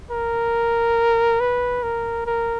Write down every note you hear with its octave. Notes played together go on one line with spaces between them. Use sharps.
A#4
B4
A#4
A#4